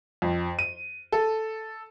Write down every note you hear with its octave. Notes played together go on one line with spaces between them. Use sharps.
F2
D#7
A4